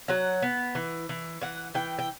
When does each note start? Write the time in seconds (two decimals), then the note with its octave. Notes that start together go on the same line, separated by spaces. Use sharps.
0.08 F#3 F#5
0.42 B3
0.75 E3
1.09 E3
1.41 E3 F#5
1.75 E3 G5
1.99 G5